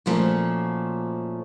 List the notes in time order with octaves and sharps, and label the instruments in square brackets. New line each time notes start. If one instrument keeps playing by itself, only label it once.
[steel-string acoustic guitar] A#2 F3 A3 C#4 F#4